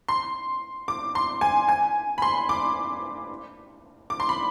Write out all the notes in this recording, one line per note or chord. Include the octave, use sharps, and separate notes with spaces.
C6
D6
C6
G#5
G#5
B5
C6
D6
D6
C6
B5